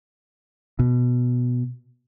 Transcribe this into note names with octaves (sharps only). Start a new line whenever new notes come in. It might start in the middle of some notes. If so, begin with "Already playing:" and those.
B2